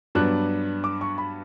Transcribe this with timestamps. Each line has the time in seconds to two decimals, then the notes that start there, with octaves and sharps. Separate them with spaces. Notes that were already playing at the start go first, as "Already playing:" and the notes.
0.15 G2 F#3 B3 D4 F#6
0.84 D6
1.01 C#6
1.18 B5